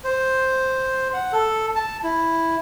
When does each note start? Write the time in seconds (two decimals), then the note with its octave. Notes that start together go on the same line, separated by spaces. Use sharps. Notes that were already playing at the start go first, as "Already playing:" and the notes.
0.04 C5
1.13 F#5
1.32 A4
1.76 A5
2.03 E4